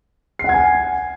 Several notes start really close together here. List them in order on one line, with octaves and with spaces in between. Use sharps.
C7 F#5 G#6 G#5